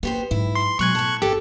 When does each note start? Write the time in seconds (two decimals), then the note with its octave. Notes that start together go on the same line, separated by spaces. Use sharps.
0.03 A#3 B3 G4 C5
0.31 G#2 F#3 E4
0.55 C6
0.79 B2 F#3 G#3 C#6 F#6 G#6
0.95 A2 A5
1.22 G1 G4 A4